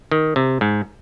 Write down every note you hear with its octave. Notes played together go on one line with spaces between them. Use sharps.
D#3
C3
G#2